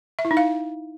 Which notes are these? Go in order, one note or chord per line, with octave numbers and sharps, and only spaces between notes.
E5
E4
D#4
F5